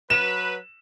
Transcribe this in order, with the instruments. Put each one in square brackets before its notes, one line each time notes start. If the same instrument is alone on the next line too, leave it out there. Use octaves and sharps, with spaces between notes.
[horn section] F#3 B4 [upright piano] E7